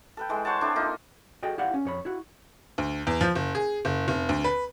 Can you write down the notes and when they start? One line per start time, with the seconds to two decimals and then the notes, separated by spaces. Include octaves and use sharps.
0.17 A4 B4 G5
0.29 E3 G#3
0.45 C5 C#5 F#5 A5
0.61 C4 D4 E4 A4
0.75 A#3 D#4 F4
1.43 F#4 G#4 A4 D#5 G5
1.58 E4 G4 D5 F5 F#5
1.74 C#4
1.85 F2 C#5 B5
2.05 E4 F#4
2.78 D2
3.07 E2
3.21 F3
3.35 F#1
3.55 G#4
3.85 F#1
4.08 F1
4.29 D2
4.44 B4